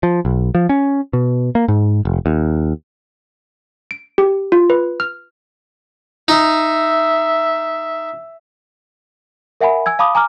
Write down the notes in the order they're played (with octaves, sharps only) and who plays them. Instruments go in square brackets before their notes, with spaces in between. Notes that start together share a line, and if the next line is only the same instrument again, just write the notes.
[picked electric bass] F3
B1
F3
C#4
B2
A#3
G#2
F1
D#2
[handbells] D7
G4
F4
B4
F6
[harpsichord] D#4 [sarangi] E5
[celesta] A#4 E5 F#5 G#5 B5
G#5 E6 G#6
F5 A5 B5 D6 D#6
G#5 A#5 D6 F6